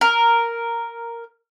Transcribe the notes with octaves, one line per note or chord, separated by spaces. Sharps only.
A#4